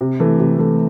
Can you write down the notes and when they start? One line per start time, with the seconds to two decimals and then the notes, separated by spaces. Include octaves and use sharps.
0.01 C3
0.20 E3 A3
0.40 C3
0.58 E3 A3